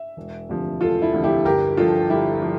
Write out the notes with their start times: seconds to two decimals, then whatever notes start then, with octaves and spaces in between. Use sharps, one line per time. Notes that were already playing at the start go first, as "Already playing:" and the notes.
Already playing: E5
0.17 E1
0.49 D2 C3 F3
0.81 E1 F4 A4
1.02 E4
1.13 D2 C3 F3
1.23 E4 G4
1.45 G1 G4 A#4
1.77 G2 F3 F4 A4
2.10 G1 E4 G4
2.42 F3